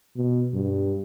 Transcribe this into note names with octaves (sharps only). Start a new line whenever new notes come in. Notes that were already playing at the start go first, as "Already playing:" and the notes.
B2
G2